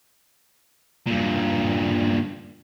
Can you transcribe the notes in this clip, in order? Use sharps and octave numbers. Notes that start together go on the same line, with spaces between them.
G2 A#2